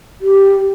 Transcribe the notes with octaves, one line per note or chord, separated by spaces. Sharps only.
G4